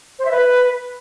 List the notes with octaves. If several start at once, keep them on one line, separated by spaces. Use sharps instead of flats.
C5
E5
B4